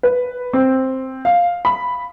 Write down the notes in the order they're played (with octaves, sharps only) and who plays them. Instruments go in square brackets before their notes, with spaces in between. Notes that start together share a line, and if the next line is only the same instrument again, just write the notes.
[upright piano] B4
C4
F5
B5